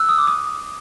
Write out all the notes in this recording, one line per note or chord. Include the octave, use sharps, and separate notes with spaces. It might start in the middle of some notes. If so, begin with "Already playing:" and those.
Already playing: E6 F#6
D#6
D6
D#6